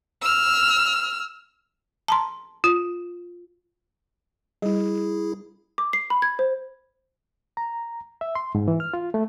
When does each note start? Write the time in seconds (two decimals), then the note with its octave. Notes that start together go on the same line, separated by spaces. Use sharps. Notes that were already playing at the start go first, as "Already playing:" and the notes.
0.22 E6 F6
2.08 A5 A#5 C6
2.64 F4
4.62 G3 E4 G#4
5.78 D6
5.93 C7
6.10 B5
6.22 G#6
6.39 C5
7.57 A#5
8.21 E5
8.35 C6
8.55 G#2
8.68 E3
8.80 F6
8.94 F4
9.14 A3